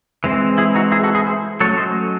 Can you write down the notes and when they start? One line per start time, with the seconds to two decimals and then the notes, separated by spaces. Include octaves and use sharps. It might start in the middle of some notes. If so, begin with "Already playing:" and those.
0.24 E3 G#3 C4
0.58 E4 G#4
0.75 D#4 F#4
0.92 E4 G#4
1.03 F#4 A4
1.15 E4 G#4
1.26 G#4 C5
1.60 F#3 A3 C#4 A4 C#5
1.78 C5 D#5